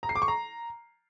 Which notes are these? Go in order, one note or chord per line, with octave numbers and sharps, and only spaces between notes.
A#5
C7
D6
C#6
A#5